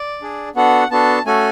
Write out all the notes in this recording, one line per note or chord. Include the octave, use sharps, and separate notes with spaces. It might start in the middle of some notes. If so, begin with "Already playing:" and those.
Already playing: D5
D4 G#4
B3 D4 F#4 A4 F#5
B3 D4 F#4 A4 A5
A3 C#4 F#4 A4 G#5